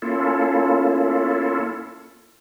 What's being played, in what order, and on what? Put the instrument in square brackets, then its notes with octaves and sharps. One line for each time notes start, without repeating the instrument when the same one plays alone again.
[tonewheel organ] A#3 C#4 E4 F4 A4